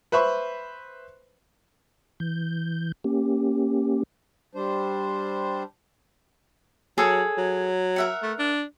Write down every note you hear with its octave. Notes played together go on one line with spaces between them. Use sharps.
B4 C5 E5 B5 C#6
E3 G6
A#3 C#4 G4
G3 D4 C5
F#3 G#4 A4 C#5
F#3
A#4 E5 F#5
A3
D4